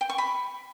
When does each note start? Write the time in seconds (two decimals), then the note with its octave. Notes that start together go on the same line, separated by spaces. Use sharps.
0.01 G5
0.10 C#6
0.18 B5